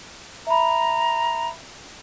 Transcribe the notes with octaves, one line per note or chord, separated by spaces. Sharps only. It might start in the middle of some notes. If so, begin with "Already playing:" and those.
E5 A#5 B5